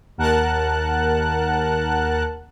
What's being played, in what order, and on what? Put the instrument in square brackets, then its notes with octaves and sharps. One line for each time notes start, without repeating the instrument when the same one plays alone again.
[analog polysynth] D#2 A#4 F#5 A5 F#6